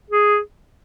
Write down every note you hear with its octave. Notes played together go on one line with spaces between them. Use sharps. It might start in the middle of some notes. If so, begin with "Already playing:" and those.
G#4